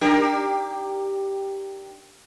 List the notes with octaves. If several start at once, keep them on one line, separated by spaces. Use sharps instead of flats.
D4 G4 A#4